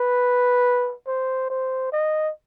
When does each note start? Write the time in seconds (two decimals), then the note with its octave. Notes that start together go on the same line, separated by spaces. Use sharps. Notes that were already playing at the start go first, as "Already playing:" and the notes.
Already playing: B4
1.07 C5
1.50 C5
1.92 D#5